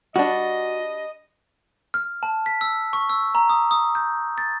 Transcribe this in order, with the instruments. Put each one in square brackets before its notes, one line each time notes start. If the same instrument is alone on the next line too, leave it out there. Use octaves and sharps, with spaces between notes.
[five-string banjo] G3 D4 [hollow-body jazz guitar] F#4 [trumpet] D#5
[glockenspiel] F6
A5
B6
E6
C#6
E6
A#5
D#6
D#6
G6
A6